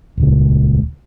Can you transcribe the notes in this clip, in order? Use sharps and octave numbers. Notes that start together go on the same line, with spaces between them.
D#1 C#2